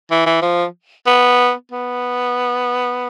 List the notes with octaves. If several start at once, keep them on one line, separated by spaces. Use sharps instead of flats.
E3
E3
F3
B3
B3